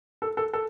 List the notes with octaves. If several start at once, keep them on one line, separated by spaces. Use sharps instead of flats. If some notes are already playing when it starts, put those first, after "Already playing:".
A4
A4
A4